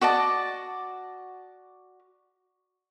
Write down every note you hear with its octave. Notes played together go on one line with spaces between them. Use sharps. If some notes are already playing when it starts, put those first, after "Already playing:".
F#4 D5 D#5 A5